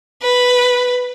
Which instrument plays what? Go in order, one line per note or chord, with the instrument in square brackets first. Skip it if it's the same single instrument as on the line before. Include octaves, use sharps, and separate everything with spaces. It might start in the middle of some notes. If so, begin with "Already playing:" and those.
[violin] B4